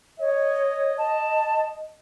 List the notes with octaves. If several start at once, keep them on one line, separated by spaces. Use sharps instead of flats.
C#5 D#5
A5